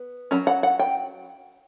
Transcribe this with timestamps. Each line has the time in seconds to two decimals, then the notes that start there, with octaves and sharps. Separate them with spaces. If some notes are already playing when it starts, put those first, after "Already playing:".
Already playing: B3
0.31 F#3 C#4
0.47 F#5
0.63 F#5
0.79 G5